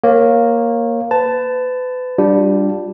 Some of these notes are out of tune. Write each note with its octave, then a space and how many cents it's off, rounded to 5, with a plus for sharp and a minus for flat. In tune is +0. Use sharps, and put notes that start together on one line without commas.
A#3 +0 C#5 -25
B4 +35 A5 +0
G3 +0 D4 +0 F4 +30